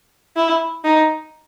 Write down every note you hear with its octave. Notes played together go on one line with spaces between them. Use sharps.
E4
D#4